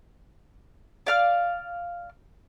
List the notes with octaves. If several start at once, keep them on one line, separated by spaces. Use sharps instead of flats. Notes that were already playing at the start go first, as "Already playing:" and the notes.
D5 F5 F6